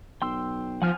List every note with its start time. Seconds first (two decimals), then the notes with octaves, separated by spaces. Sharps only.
0.22 B1 G5 C6 E6
0.82 F3 F#5 G#5 F6